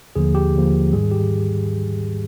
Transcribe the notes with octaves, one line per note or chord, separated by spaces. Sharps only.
D#2 D3 F3 A#3 G#4
G4
D#2 D3 F3 A#3
G#2 D#3 G3 G#4
G4